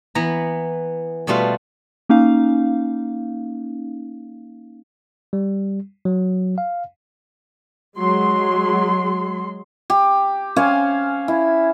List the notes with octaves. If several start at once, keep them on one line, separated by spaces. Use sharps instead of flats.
E3 B3 A#5
B2 G3 A3 F4 B4
A#3 C#4 D#4 F5
G3
F#3
F5
F#3 G#3 C6
G4
C#4 C5 F5 G#5
E4